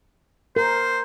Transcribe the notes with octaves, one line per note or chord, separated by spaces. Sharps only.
A#4 C5